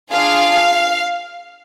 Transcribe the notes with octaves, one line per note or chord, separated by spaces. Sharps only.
D4 F4 G#4 F5